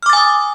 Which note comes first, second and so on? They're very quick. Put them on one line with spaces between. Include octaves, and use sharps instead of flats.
F6 D6 A6 G#5 D#6